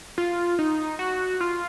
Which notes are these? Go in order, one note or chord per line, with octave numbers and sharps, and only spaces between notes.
F4
D#4
F#4
F4